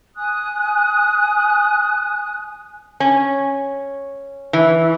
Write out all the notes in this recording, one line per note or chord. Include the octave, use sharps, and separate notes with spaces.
G#5 D#6 F#6
C#4
E3